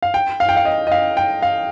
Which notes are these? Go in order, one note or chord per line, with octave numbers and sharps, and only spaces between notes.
F5
G5
F5
G5
F5
D#5
D#5
F5
G5
F5